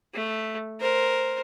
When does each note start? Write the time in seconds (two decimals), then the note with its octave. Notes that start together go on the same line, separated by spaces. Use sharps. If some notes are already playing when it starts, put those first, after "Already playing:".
0.14 A3
0.81 A#4 C5